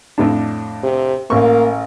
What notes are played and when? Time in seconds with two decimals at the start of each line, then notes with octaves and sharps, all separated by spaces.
0.18 F2 A2 D4
0.83 C3
1.30 A1 A#3 C#6